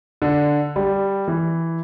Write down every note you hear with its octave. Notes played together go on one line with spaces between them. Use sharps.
D3
G3
E3